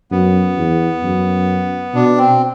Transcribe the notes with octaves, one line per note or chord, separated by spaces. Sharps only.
F#2 B3
E2
F#2
B2 D4
C4